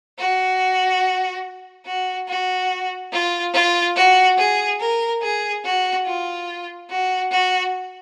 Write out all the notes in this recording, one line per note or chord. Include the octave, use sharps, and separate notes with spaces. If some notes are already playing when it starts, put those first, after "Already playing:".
F#4
F#4
F#4
F4
F4
F#4
G#4
A#4
G#4
F#4
F4
F#4
F#4